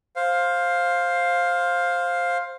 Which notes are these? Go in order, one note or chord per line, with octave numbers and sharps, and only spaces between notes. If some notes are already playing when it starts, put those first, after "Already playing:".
C5 F5